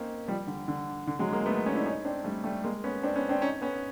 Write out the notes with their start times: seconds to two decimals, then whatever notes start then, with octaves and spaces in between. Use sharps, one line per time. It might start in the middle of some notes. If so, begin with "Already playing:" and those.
Already playing: A#3 C4 C#4 D#4
0.28 F3 G3
0.47 D3
0.68 D3
1.07 D3
1.19 F#3 G#3
1.32 G#3 A#3
1.46 A3 B3
1.66 C#4 D#4
1.75 D4 E4
1.86 C#4 D#4
2.05 C4 D4
2.24 G3 A3
2.44 G3 A3
2.64 G#3 A#3
2.84 B3 C#4
3.03 C4 D4
3.16 B3 C#4
3.29 C4 D4
3.42 C#4 D#4
3.62 B3 C#4